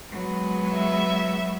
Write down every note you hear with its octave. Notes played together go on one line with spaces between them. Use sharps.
F#3 G#3 B3
E5